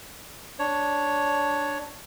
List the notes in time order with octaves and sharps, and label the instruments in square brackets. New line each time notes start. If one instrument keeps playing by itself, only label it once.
[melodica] D4 C#5